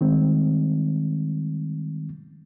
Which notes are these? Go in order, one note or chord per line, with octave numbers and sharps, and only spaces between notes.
D#3 G3 G#3 C4